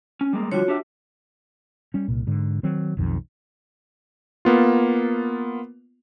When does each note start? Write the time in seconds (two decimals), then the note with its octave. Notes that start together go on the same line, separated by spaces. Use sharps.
0.21 C#4
0.33 G3 G#3 A#3
0.52 D3 F3 G3 F4 F#4 C#5
0.68 D4 G4 E5
1.94 G3 C#4
2.08 C2 A#2
2.27 G#2 D3
2.63 D#3 F#3 C4
2.97 B1 F2 D#3
4.45 A#3 B3 F4